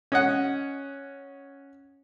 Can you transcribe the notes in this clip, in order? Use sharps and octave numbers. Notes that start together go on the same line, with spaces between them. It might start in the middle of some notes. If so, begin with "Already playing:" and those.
C#4 D#5 F#5